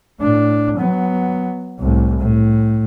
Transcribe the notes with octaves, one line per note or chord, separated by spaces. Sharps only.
A2 D4
F#3 B3
C2 A2
A2